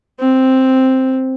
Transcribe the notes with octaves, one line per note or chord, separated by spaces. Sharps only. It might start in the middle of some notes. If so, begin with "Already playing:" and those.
C4